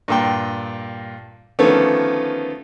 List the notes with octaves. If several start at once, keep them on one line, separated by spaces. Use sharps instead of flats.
G2 A#2 G5
D3 D#3 F3 A3 B3 C#4